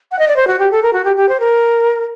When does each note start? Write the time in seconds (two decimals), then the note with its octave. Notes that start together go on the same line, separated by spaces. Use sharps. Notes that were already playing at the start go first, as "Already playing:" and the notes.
0.11 F#5
0.19 D#5
0.28 D5
0.36 C5
0.47 F#4
0.59 G4
0.71 A4
0.83 A#4
0.93 F#4
1.05 G4
1.16 G4
1.29 C5
1.40 A#4